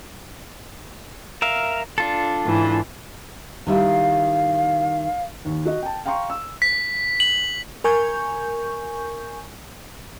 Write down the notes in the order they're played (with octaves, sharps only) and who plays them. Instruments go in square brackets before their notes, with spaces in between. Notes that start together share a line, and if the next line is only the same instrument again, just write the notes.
[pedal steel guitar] A#4 E5 F5
D4 F4 A4
[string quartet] G#2 E3
[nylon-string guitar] D#3 G3 E4 [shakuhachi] F5
[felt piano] D#2
F#4 D#5
G5 A5
F5 G5 A#5 C6 C#6
E6
[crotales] B6
F#7
[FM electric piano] A#4 G#5 C#6 G6